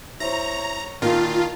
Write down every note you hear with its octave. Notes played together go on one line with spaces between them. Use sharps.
E4 C5 C#5 A#5
A#2 D#3 F4 F5 A5